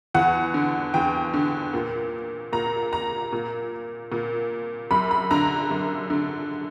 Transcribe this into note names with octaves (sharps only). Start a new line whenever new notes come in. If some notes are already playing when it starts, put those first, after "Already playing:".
E2 F#5
D3
E2 G5
D3
A#2
A#2 A#5
A#5
A#2
A#2
F#2 B5
B5
D3 A#5
F#2
D3